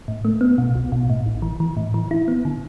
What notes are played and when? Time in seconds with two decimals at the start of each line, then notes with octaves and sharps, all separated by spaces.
0.08 A2
0.25 A3
0.41 B3
0.58 B2
0.75 B1
0.92 B2
1.10 A2
1.26 A1
1.42 E3
1.60 E3
1.77 A2
1.94 E3
2.11 E4
2.28 B3
2.45 D3